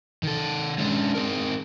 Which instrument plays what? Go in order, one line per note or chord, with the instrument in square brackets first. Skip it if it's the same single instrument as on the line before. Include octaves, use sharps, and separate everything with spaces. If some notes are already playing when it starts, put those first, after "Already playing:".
[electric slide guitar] D#3 A4
G#3 C#4 D4
C4 G#4 A#4